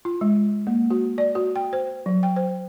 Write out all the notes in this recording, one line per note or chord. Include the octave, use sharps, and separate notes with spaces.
F4
G#3
A#3
F#4
D5
F#4
G5
C5
F#3
G5
C5